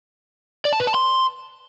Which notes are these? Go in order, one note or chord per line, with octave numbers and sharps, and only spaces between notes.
D5
A5
B4
A5
C6